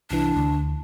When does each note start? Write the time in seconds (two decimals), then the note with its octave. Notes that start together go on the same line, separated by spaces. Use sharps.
0.11 C2 E3 D4
0.36 D2